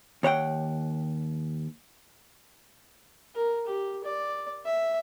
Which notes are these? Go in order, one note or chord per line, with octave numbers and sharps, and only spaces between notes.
D#2 C#5 F#5 G5
A#4
G4
D5
E5